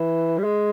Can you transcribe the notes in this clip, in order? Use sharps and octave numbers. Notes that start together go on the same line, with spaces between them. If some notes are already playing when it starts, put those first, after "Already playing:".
Already playing: E3
G3
G#3